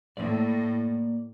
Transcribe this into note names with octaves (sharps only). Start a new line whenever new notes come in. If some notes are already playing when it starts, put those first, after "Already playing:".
A2 A#3 D5